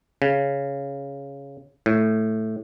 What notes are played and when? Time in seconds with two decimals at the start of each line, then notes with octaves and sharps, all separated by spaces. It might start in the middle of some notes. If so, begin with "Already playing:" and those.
0.22 C#3
1.86 A2